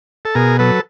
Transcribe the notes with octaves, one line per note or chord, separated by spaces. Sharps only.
A4
B2 G#4 A#4
F#3 A4 B4